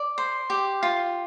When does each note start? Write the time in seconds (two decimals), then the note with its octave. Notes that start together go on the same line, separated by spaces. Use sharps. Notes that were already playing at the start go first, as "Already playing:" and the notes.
Already playing: D5
0.18 C5
0.50 G4
0.83 F4